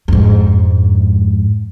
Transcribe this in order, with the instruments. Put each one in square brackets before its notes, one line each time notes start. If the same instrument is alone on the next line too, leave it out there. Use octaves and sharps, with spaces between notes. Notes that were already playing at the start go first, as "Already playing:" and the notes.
[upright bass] F2 G#2